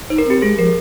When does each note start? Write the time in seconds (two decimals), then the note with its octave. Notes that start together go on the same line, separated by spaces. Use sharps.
0.10 D#4 C5
0.18 A#4
0.27 C4 G4
0.42 G#3 G#4
0.58 F3 A#4